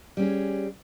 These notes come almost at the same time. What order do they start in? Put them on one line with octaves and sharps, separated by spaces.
G3 C#4 G#4